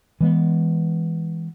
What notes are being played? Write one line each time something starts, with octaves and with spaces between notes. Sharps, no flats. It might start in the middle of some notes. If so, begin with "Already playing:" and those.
E3 G#3 B3